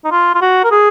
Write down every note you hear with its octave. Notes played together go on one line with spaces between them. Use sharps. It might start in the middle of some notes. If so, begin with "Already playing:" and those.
D#4
F4
F4
F#4
A#4
G#4